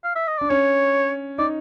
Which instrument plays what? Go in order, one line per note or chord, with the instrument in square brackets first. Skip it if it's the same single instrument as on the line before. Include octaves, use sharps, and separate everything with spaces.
[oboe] F5
E5
D#5
[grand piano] D4 [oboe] D5
[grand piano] C#4 [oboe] C#5
[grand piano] D#4 [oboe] D5